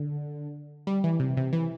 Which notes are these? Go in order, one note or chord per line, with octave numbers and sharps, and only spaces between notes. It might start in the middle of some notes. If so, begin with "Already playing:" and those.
Already playing: D3
G3
E3
C3
C3
E3